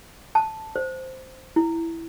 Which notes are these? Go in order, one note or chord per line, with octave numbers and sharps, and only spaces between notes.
A5
C5
E4